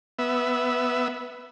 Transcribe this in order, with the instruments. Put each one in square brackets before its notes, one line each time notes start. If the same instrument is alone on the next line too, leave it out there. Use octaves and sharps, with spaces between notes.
[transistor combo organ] B3 E5